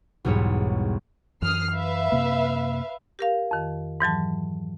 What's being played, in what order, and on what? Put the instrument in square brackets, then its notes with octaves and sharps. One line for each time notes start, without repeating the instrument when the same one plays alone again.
[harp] B1 E2 G#2 G3 C#5
[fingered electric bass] F#2 E3 [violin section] D#6 F6 C7
[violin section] B4 E5 F5
[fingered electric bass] F#2 C3 A#3
[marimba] G4 A#4 F5
F2 D#3
G#2 E3 F#3 A5